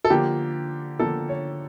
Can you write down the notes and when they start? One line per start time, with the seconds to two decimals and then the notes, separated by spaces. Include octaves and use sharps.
0.05 A4
0.10 D3 F3 A#3 G4
0.99 D3 F3 A#3 A4
1.29 C#5